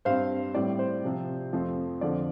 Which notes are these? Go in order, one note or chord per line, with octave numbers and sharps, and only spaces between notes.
G2 G3 C4 C5 F5
A2 G3 C4 D5
C5
C3 F3 C4
F2 F3 A3 C4
F2 D3 F3 D5